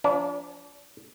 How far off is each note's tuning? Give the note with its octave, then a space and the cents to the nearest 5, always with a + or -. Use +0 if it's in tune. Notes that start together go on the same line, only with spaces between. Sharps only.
F3 +0 D4 -40